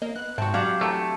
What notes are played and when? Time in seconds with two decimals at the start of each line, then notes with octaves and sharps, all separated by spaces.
0.02 A#3 D#5
0.16 B3 F#6
0.38 G#2 C4 F#4 E5 A5
0.54 F#3 D4 G4 F5
0.81 E3 A3 G5 A#5